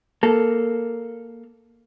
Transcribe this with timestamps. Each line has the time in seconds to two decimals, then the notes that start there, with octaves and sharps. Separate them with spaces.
0.23 A#3 A4